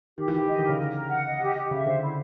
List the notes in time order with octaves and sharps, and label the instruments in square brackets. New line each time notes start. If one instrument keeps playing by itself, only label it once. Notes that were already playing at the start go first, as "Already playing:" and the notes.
[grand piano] D#3 [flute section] G4
[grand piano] E3
[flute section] G4
[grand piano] E3
[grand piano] D#3 [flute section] D#5
[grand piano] D3
[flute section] A#4
[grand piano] C#3
[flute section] A#4
A#4
F#5
D#5
G4
G4
[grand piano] C#3 [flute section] E5
[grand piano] D3 [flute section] C5
[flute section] E4